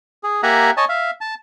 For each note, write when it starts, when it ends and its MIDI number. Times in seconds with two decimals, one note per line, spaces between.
0.23 0.41 68
0.43 0.71 58
0.43 0.71 67
0.43 0.71 76
0.43 0.71 78
0.43 0.71 80
0.43 0.71 82
0.77 0.85 73
0.77 0.85 75
0.77 0.85 80
0.77 0.85 81
0.89 1.11 76
0.89 1.11 77
1.21 1.34 81